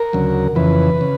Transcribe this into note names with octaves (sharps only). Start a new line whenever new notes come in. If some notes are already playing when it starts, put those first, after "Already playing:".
Already playing: A#4
D2 C#3 F#3
F2 C#3 E3 B4
C#3